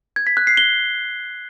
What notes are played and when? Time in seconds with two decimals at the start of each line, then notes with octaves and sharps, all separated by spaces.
0.16 G#6
0.27 B6
0.37 F#6
0.47 C7
0.57 G7